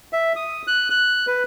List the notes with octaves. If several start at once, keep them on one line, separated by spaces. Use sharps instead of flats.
E5
D#6
F#6
F#6
B4